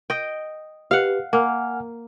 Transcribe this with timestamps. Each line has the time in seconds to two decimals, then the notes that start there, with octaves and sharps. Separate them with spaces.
0.10 D#5 G5
0.91 G4 B4 F5 F#5
1.33 A#3 F#5 G#5 F6